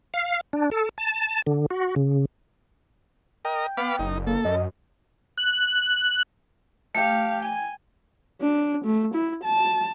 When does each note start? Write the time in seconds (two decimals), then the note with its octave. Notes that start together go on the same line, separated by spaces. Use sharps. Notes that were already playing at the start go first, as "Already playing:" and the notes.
0.14 F5
0.53 D4
0.71 A4
0.98 A5
1.47 D3
1.71 F#4
1.96 C#3
3.45 A#4 D#5 G5
3.77 B3 F5 B5 D6
3.99 F#1 D#4
4.27 A#3 A4
4.45 F#2 D#5
5.38 F#6
6.95 A3 G4 F5
7.42 G5 G#5
8.41 D4
8.85 A3
9.15 E4
9.44 A5